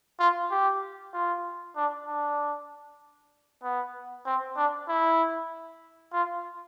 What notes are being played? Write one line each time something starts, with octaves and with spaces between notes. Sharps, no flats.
F4
G4
F4
D4
D4
B3
C4
D4
E4
F4